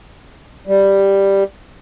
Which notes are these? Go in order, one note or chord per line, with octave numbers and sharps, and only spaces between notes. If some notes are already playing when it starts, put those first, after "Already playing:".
G3